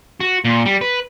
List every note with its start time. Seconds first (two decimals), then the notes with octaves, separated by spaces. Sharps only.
0.21 F#4
0.45 A#2
0.66 G3
0.81 B4